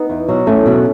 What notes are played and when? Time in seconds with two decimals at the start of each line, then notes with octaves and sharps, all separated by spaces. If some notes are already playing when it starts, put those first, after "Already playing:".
Already playing: B3 D#4
0.10 E2
0.29 B2 F#3
0.46 E2 A3 C#4
0.66 B2 F#3